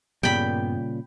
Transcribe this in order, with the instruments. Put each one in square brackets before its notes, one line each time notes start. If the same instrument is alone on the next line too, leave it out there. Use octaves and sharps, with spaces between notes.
[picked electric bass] G2 B3 [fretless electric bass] A#2 C#3 G3 [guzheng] G5 B5